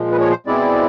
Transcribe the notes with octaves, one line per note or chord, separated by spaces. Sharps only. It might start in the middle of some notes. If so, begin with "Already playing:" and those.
Already playing: A#2 F3 G#3
B4
C#5
C5
B2 G#3 C4 E4 D5